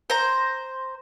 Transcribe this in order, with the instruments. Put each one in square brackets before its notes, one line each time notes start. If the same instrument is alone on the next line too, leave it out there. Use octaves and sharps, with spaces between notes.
[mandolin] C5 A#5